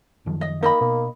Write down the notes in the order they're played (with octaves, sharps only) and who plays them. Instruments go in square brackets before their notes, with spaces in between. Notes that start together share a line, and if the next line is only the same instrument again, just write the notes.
[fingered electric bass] F#2 D#3 F3
[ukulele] D#5
[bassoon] A#3 [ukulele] D#4 D#5 B5
[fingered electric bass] B2 [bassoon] A#3